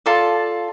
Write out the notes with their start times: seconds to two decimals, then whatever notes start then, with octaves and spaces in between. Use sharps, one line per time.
0.06 F4 A4 D5 A5